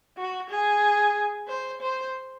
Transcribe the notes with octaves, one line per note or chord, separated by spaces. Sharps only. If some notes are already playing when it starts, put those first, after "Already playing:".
F#4
G#4
C5
C5